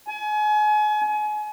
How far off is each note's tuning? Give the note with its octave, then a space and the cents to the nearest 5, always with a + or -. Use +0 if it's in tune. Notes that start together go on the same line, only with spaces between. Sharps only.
G#5 +35